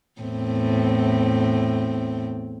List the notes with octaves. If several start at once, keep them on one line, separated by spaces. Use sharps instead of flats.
E2 A2 C4